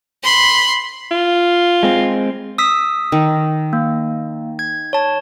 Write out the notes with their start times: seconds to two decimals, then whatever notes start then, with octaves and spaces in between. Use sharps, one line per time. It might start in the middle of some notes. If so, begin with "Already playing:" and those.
0.23 B5 C6
1.11 F4
1.83 G#3 C4
2.58 D#6 E6 B6
3.12 D#3
3.73 A#3
4.59 G#6
4.93 C#5 A5